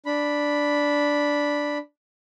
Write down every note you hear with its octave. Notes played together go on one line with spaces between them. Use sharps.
D4 B5